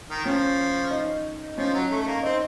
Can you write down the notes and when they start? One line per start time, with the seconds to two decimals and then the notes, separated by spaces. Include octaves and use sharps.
0.10 D#3
0.25 F3 C#4
0.91 D#4
1.58 F3 C#4
1.74 F#3
1.91 A3
2.02 A3
2.07 A#3
2.23 C4 D#4